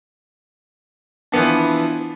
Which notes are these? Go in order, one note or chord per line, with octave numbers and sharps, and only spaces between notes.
E3 F3 B3 D4